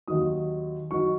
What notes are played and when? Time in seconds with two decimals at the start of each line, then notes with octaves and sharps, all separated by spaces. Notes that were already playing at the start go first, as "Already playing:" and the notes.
0.08 D#2 D#3 F#3 D#6
0.91 D#3 F#3 C#6